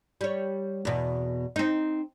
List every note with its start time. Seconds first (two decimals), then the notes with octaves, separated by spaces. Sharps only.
0.21 G3 C#5
0.85 E2 B2
1.56 C4 D#4